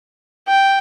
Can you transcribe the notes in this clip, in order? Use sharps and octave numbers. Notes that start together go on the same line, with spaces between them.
G5